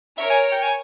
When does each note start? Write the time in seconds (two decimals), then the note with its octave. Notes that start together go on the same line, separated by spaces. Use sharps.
0.18 A#4 C#5 E5
0.30 G#5
0.52 G5
0.63 G#5